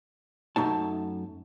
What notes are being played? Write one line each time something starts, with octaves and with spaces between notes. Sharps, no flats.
F#2 A3 D#4 A5